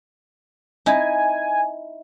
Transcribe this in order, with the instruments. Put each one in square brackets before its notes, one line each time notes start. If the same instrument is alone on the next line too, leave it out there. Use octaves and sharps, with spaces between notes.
[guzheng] D#4 E4 [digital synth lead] G#5